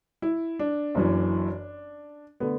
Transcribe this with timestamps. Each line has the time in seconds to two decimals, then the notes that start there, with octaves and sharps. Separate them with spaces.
0.22 E4
0.59 D4
0.95 F#1 F#2 E3
2.40 D3 A3 B3